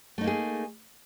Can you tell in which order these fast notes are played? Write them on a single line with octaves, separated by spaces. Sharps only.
A3 D#4 A#3 G#4